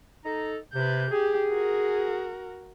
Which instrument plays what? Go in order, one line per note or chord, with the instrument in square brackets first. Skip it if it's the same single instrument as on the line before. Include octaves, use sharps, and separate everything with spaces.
[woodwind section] D#4 A4 A#5
[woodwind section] C3 [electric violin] B4 G6
[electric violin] G4 [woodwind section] G#4
[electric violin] F#4 A#4